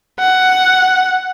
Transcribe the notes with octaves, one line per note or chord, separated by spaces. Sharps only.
F#5